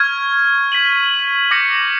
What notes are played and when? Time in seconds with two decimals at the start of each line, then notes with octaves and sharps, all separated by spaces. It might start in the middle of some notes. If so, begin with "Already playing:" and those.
Already playing: C#6 F6 G#6
0.72 G#6 B6 D#7 F#7
1.51 D6 G6 A#6 C#7